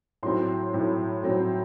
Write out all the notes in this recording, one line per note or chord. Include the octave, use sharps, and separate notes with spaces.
A2 F#3 C4 C6
A2 F#3 C4
A2 F#3 C4